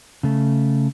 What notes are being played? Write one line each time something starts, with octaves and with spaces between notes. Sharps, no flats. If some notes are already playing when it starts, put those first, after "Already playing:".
C#3 A3